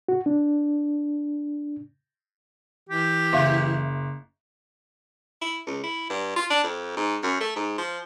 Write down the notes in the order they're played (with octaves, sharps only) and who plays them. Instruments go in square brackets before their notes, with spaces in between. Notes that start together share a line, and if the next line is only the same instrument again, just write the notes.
[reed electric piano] F#4
D4
[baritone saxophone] E3 [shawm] G4
[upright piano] F#1 G6 [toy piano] E5 F5
[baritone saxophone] E4
C#2
E4
G2
F4
D4
F2
G#2
F#2
A3
G#2
F3